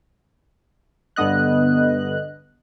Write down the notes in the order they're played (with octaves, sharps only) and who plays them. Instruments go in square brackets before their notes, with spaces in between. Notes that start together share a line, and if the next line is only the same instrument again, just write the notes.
[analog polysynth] G2 D3 B3 D#5 F#6